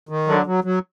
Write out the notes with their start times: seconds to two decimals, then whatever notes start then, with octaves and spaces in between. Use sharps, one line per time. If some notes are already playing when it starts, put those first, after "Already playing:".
0.09 D#3
0.27 D3 F#3
0.46 F#3
0.64 F#3